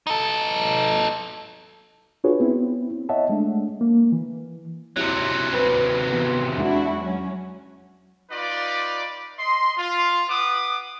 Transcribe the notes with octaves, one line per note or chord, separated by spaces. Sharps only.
D#4 A4
D4 F4 F#4 G#4 B4 C#5
B3 C4 E4
C#5 D#5 E5 F#5 A5
G#3 A3 D4
A#3
E3
C3 F#3 C4 E4 G4
C4 B4
E3 B3
E2 G#3 D4 E4 F#4
F#3 C#4
D#4 F4 B4 D5
D#5 C6
F4
B4 F#5 D6 D#6